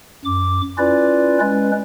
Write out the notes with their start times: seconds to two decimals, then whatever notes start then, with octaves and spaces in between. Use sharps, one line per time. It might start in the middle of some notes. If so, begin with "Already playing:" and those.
0.25 F#2 D6
0.78 C#4 E4 F4 B4 D5
1.40 G#3 C#4 B4